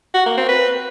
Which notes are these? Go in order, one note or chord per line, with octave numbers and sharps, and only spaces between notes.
F#4
A#3
C4
B4